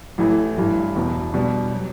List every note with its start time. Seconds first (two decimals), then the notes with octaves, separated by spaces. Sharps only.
0.18 A1 A2 E3 A3
0.57 A1 G2 E3
0.95 E1 E2 B2
1.34 B2 G3 D4
1.73 F#3